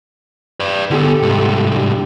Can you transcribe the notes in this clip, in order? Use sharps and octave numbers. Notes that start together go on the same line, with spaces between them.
B4 D5
D3 B3 G4 A4
C2 G#2
D4 G4